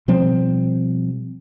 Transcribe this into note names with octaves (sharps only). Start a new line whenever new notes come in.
B2 F3 G3 C4